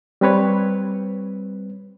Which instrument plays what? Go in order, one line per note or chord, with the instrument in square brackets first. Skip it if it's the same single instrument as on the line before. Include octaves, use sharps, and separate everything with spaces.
[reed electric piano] G3 C4 B4 C#5